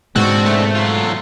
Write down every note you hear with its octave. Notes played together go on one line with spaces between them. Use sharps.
G#2 B2 G#3 C4 D4 F#4
A3
F#3 F4